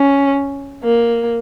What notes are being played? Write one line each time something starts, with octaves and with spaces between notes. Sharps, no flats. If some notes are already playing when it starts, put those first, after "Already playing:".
Already playing: C#4
A#3